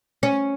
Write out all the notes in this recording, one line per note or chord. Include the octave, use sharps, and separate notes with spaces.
C#4